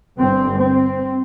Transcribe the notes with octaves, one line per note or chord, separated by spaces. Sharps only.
G1 G2 C4
C4